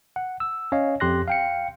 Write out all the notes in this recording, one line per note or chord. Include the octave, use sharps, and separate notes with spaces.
F#5
E6
C#4 C#5 D#5 F5
F2 G4 C6 F#6 A#6
F5 G5 C#7